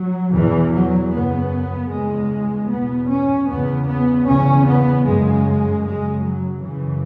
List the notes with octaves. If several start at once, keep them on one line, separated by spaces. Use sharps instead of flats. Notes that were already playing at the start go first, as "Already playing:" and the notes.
Already playing: F#3
E2 B2 E3
F#3
F#2 C#3 B3
E2 C#3 G#3
E2 B2 B3
C#4
E2 C#3 B3
B3
E2 C#3 C#4
B3
F#2 C#3 G#3
F#2 C#3 G#3
F#3
F#2 C#3 E3